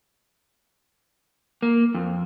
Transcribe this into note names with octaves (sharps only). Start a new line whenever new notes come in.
A#3
F2